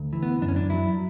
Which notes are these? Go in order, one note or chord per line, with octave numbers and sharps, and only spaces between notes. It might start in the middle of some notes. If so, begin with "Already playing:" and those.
Already playing: D2
E3
B3
F#2 D4
C#4
D4
F#3 E4